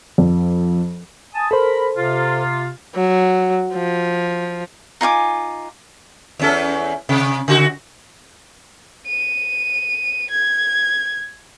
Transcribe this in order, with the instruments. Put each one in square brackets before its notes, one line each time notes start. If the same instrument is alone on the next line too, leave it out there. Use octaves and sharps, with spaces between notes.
[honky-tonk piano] F2
[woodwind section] G#5 A5 D#6
[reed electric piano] A4 C5 [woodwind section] A#4 B5
[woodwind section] C3 F4
[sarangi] F#3
F3
[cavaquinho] D#4 F4 G#5 D6
[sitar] E2 C#4 A4
C3
C#3 F#4
[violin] D#7
G#6